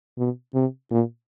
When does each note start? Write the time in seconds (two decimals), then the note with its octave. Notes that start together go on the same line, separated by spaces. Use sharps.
0.18 B2
0.54 C3
0.91 A#2